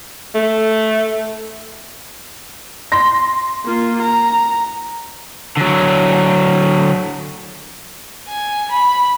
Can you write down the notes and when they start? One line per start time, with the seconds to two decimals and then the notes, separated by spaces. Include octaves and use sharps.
0.35 A3
2.92 C6 A#6
3.65 A#3 F4
4.02 A#5
5.57 D3 F#3
8.29 G#5
8.72 B5